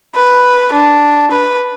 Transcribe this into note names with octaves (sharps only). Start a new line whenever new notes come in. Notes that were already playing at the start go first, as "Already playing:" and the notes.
B4
D4
B4